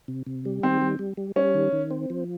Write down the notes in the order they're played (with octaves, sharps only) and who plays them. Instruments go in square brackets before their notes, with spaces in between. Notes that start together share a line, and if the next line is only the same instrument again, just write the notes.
[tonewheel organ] C3
C3
G3
[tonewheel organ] D#3 [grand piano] C4
[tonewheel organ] G3
G3
G3
[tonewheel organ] G3 [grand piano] C#4
[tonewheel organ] D#3
D#3
C4
F3